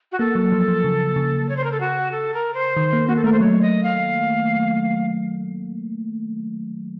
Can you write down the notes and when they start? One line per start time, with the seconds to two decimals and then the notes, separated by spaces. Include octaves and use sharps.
0.12 F#4
0.19 A#3 A4
0.35 F#3
0.52 F3
0.68 F3
0.84 C#3
1.16 C#3
1.49 C#5
1.57 C5
1.64 A#4
1.72 A4
1.80 F#4
2.12 A4
2.34 A#4
2.54 C5
2.77 D#3
2.93 A#3
3.08 A#3 F#4
3.16 A4
3.24 A3 A#4
3.32 C5
3.40 F#3 C#5
3.62 D#5
3.83 F5